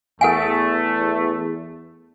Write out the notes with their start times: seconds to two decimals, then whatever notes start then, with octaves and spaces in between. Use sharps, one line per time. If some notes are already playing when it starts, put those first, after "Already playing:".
0.21 E2 A3 A4 F#5 G#5